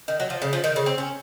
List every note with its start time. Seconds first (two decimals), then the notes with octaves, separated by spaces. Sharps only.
0.08 D#3
0.20 F#3
0.30 F3
0.42 C#3
0.53 F3
0.64 D#3
0.76 C#3
0.86 C4
0.98 C#4